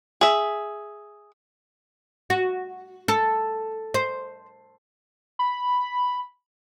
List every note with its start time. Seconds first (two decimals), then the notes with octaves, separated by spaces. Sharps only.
0.21 G#4 E5
2.30 F#4
3.08 A4
3.94 C5
5.39 B5